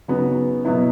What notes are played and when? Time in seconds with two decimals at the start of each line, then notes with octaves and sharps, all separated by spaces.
0.08 C#3 F#3 B3 D#4 F#4
0.65 B2 F#3 B3 E4